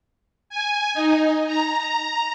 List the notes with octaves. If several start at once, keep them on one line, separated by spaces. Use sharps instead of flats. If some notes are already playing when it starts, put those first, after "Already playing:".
G#5
D#4
A#5